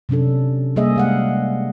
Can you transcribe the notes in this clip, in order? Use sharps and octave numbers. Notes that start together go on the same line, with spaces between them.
C3 F#3 C#4 D4 A4
G3 A#3 G#4 D#5 E5
G#3 F5 F#5